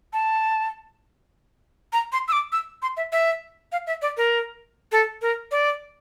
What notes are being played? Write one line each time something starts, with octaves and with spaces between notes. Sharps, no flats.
A5
A#5
C6
E6
D6
E6
C6
E5
E5
F5
E5
D5
A#4
A4
A#4
D5